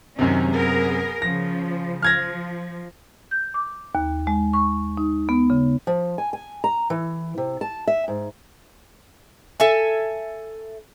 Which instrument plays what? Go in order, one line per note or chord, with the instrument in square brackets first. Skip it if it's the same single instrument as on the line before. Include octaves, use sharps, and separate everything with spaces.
[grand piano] F#2 C3 [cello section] D#3 C#4
[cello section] B3 G#4 A#4
[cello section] C#3 F3 [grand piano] A#6
[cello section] F3 [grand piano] F6 G#6 A#6
[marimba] G6
D6
D#2
G#3
C#6
D#4
B3
C#3
[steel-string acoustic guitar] F3
G#5
G#5
A#5
E3
C3
A5
E5
G#2
[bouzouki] A4 E5 G#5